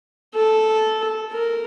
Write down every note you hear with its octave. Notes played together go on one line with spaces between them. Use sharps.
A4
A#4